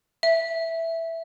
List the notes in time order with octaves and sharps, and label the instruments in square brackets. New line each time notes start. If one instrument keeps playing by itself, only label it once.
[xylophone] E5